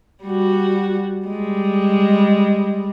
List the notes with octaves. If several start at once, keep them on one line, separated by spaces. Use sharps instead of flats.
G3 F#4
G3 G#3